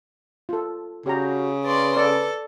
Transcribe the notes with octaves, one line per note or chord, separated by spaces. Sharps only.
F4 A4
C#3 F#4 G4 A#5
B4 D5 C6
A4 D5